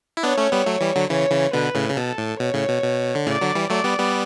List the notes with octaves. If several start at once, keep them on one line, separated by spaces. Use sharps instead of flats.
E4
B3 D4 C#5
A3 C#4
G3 B3
F#3 A3
E3 G3
D3 F#3
C#3 E3 C#5
C#3 E3
B2 D3 B4
A2 C#3
C#3
B2 A4
A2
B2 C#5
A2 C#3
B2
B2
D3
A2 C#3 D5
D3 F#3
E3 G3
F#3 A3 D5
G3 B3
G3 B3